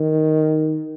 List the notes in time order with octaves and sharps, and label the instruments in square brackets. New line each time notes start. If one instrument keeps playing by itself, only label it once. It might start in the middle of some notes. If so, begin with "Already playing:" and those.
Already playing: [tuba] D#3